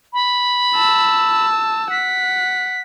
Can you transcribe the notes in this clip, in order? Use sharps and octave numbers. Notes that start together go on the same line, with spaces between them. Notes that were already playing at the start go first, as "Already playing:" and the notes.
B5
A5 E6
F#5 B6